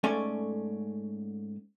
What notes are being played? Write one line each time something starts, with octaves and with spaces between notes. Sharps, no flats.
G#2 A3 C#4 A4 D5 G#5